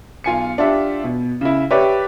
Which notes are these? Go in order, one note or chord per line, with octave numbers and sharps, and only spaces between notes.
B1 F4 G#5 C#7
D4 F4 G4 E5
B2
C#3 E4
G4 B4 C#5 D5 E5